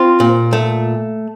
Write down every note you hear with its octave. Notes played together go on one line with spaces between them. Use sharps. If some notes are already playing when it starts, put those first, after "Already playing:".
Already playing: C4 F4
A#2
A3